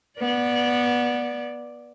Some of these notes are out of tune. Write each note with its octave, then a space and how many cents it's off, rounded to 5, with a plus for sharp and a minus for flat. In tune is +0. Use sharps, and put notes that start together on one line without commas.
B3 -20 D5 +0